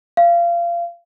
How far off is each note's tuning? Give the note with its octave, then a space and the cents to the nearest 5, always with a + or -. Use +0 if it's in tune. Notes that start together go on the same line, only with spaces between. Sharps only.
F5 -25